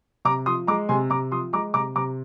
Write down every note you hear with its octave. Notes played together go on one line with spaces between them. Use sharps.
C3 A#5 D6
F3 C6 D#6
G#3 A#5 D6
C3 G#5 C6
C3 A#5 D6
F3 C6 D#6
G#3 A#5 D6
C3 A#5 D6
C3 A#5 D6